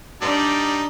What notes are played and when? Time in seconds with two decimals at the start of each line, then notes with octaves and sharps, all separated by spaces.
0.22 G3 D4 D#4 D5